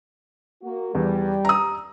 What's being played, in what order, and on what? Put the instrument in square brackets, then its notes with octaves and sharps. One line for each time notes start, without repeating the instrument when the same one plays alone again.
[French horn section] A#3 F#4
[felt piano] E2 [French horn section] G3
[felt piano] A#5 D#6